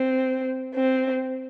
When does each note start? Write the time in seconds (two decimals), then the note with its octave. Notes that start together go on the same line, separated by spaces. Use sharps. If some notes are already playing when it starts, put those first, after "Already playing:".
Already playing: C4
0.75 C4